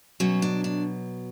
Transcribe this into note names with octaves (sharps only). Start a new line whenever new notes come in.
B2 F#3 C#4
D4
D4